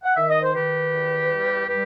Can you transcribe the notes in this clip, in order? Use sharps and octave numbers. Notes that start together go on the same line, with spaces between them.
F#5
D#3 E5
D#5
C5
D#3 G4 B4
E2
G3
G3 G4 B4